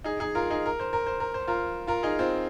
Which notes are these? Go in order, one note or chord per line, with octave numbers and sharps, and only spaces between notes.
D#4 G#4
D#4 G#4
F4 A#4
D#4 G#4
A#4
C5
A#4
C5
A#4
C5
F4 A#4
F4 A#4
D#4 G#4
C4 F4